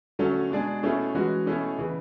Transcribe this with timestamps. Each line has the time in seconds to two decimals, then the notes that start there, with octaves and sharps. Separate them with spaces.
0.19 D3 F#3 A3 C#4
0.51 B2 G#3 D4 G#4
0.83 B2 A3 C#4 E4 G#4
1.14 E3 G#3 C#4 F#4
1.46 B2 A3 C#4 E4 G#4
1.79 C#3 E3